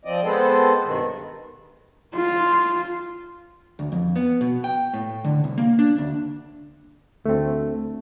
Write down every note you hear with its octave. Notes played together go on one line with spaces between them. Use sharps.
F3 C4 D5 D#5
G#3 B3 C4 A4 C5
G2 B2 D#3
F4
D2
F2
B3
B2
G5
A2
D3
C2
A#3
D4
D2
D2 A3 C4